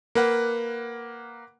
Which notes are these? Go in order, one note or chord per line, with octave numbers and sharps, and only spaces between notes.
A#3 B4 F#5